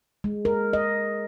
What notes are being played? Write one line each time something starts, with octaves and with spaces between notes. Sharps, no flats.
G#3
A#4
D#5